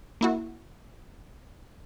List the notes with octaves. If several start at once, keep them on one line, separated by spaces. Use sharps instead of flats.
A#3 E4 F#4